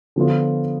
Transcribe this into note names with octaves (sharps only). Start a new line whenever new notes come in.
D3 F3 B3 F4